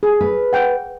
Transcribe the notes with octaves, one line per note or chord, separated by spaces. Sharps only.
G#4
B4
F#5 G5